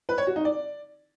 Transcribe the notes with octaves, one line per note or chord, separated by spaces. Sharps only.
B4
C#5
F#4
D#4
D5